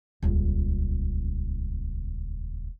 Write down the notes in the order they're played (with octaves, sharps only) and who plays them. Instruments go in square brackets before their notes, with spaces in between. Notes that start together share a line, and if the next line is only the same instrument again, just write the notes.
[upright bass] D#1 C#2